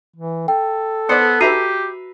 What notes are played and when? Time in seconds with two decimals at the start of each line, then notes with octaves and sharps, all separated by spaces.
0.16 E3
0.48 A4 G5
1.09 B3 C5 D5 C#7
1.41 F#4 G4 B4 E5 A#5 C7 D#7